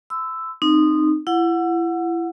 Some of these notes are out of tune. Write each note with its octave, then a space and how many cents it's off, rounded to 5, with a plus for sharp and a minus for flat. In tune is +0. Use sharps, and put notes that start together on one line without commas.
C6 -40 E6 +0
C4 +0 D#4 -20
E4 +30 F#5 -15